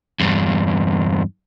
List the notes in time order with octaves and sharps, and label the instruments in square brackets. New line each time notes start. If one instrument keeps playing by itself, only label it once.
[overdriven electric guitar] E2 G2